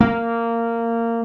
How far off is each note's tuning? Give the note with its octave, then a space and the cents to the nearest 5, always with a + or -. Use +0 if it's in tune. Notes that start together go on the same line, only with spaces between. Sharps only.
A#3 -15